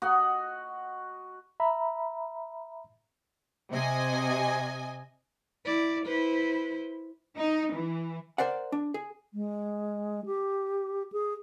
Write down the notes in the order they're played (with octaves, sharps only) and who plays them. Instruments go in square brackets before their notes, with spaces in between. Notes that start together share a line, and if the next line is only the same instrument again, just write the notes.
[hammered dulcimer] F#4 D#5 F#5
[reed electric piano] E5 A#5 B5
[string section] C3 D#5 G#5
[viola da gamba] E4 D5
E4 B4 C5
[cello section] D#4
E3
[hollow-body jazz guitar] A#4 C5 D5 F#5
D4
G#4
[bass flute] G#3
G4
G#4